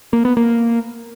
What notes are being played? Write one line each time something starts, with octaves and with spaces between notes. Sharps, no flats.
A#3
B3
A#3